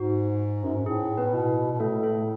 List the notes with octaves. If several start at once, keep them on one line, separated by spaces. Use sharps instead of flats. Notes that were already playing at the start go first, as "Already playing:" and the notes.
Already playing: G#2 F#4
F#2
G#2
A2 G#4
B3 B4
B2
B2
A2 A3 A4
A3 A4